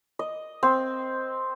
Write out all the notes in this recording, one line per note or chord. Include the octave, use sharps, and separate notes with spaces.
D#5
C4